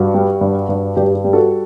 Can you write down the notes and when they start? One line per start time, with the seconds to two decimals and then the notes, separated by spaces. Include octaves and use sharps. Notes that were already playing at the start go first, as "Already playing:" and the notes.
Already playing: G2 F#4
0.14 G3
0.41 G2
0.69 G2
0.96 G2 G4
1.15 G4
1.24 G3
1.33 F#4 A4